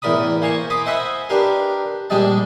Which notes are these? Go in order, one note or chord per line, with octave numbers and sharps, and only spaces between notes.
E2 A2 A#4 D5 B5 D#6
A#3 C5 G#5 A#5 C6 C#6
B5 C6 D6 D#6
C5 D#5 E5 F#5 G#5 B5
D4 G4 A#4 B4 C6
A#1 G3 G#3 D4 D#5 A5